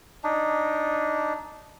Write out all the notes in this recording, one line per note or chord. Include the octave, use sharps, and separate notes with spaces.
D4 D#4